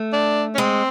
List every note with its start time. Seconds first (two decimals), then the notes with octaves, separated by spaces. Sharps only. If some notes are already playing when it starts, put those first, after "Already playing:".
Already playing: A3
0.12 D4
0.54 C#4
0.58 G#3 C4